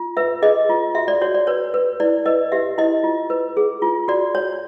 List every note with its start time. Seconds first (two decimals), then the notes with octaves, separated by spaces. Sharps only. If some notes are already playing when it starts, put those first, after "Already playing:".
Already playing: F4
0.17 B4 E5
0.42 G#4 D#5
0.70 F4
0.95 F#4 E5
1.08 D5
1.22 F#4 C#5
1.34 D5
1.47 B4 C#5
1.74 B4
2.00 E4 D5
2.26 B4 D#5
2.52 G4 E5
2.78 E4 D#5
3.04 F4
3.30 B4
3.57 G#4
3.82 F4
4.08 F#4 D5
4.35 C#5